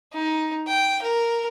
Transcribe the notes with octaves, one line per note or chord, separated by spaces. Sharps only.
D#4
G5
A#4